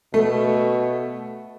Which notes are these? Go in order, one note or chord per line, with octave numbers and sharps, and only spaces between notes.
B2 A3